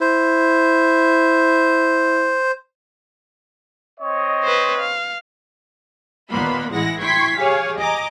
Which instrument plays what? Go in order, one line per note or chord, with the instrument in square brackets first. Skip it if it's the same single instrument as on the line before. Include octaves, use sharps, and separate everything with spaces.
[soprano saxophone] E4 [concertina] C5
[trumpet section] C4 C#5 D#5
[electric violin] B4 C5
F5
[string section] D#2 A#2 A#3 B3 B5 C6
A1 E3 G#3 E4 F#5 A#6
E4 G5 C6 C#6 G#6 B6
G4 G#4 C#5 F5 G#5
D#5 G#5 A#5 D6